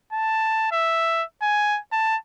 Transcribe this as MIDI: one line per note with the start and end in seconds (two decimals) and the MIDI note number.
0.13 0.68 81
0.72 1.23 76
1.42 1.80 80
1.92 2.17 81